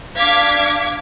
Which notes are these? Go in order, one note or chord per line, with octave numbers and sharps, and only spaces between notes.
D4 F5 D6 G#6 B6